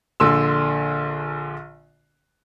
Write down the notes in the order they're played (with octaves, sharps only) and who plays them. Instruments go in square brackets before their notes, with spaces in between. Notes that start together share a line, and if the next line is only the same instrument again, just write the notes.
[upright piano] A#1 D3 C6 E6